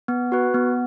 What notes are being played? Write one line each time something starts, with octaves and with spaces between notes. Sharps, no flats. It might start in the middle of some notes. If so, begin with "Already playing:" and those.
B3
F#4 B4
B3